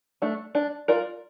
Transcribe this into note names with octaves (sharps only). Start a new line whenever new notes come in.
A3 D4
D4
F4 A#4 D5